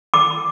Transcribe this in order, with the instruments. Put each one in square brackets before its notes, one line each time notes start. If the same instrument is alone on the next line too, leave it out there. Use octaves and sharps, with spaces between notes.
[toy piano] D6